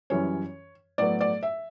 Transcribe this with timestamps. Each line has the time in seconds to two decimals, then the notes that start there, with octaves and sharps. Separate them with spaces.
0.10 F#2 E3 G3 C#4 C#5
0.98 A2 F#3 B3 D5
1.21 D5
1.43 E5